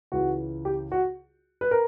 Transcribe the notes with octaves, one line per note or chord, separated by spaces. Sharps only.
C#2 C#3 E3 F#4
G4
F#4
B4
A#4